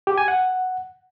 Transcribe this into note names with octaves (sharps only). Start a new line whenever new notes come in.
G4
G#5
F#5